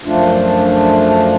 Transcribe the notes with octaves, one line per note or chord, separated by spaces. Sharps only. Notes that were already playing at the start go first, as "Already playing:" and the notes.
F#2 F3 A3 D4 F4